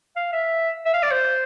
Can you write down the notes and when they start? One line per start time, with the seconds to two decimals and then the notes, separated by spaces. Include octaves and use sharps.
0.16 F5
0.33 E5
0.86 E5
0.94 F5
1.03 D5
1.11 C5